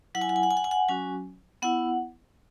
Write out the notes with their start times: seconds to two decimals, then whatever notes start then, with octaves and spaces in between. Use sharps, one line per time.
0.15 F#3 E4 F#5
0.21 G#5
0.29 F#5
0.36 G#5
0.43 F#5
0.51 G#5
0.57 F#5
0.64 G#5
0.71 F#5
0.89 F#3 C#4 F#4 G#5
1.62 B3 E4 F#5